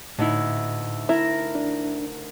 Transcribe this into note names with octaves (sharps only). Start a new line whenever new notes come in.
D2 A2 D#4 E4
E4 A#4
D4